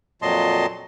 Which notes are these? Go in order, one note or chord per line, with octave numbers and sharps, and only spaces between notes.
F2 A#2 F#3 D#5 A5 C6